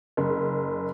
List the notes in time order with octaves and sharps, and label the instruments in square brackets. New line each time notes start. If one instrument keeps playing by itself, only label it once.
[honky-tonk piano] F#1